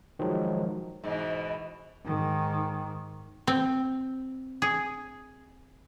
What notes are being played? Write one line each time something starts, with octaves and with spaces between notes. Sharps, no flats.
D#3 F3 F#3 G#3
G#2 B2 E3
G#2 D#3
C4
G#4